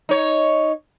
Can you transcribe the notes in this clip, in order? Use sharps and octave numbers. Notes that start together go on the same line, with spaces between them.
D#4 C#5